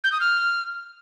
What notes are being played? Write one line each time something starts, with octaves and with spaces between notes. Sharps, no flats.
G6
D#6
F6